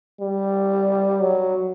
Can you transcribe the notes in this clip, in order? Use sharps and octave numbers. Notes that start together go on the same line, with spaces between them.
G3
F#3